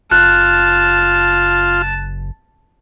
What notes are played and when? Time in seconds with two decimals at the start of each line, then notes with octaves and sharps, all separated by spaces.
0.11 F#1 F4 A5 F#6